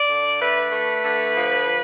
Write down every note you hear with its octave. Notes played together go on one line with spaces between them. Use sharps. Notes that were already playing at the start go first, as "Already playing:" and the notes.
Already playing: D5
D3
A3 B4
A3
D3
F3
F3